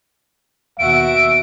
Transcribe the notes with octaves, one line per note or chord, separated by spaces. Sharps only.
D#2 B2 F#4 E5 D7